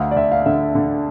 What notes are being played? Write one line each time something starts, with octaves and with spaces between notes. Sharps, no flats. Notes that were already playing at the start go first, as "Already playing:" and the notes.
Already playing: D2 F5
D5
D2 E5
F5
D3 E5
D3